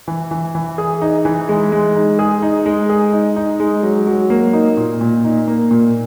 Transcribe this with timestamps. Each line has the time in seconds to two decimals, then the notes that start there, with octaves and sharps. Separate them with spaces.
0.08 E3
0.31 E3
0.55 E3
0.78 G#4
1.01 D#4
1.25 E3
1.49 G#3
1.72 G#3
1.95 D#4
2.19 G#4
2.42 D#4
2.66 G#3
2.89 G#4
3.13 D#4
3.36 D#4
3.60 G#3
3.83 F#3
4.07 F#3
4.30 A#3
4.53 D#4
4.77 A#2
5.01 A#2
5.24 D#4
5.47 A#3
5.71 A#2